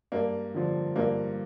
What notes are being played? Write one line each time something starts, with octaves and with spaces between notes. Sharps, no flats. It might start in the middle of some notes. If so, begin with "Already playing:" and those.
G2 A#3
D3 F3
G2 A#3